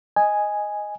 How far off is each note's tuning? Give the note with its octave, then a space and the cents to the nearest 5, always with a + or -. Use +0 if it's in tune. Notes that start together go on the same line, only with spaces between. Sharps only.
D#5 +0 G#5 +0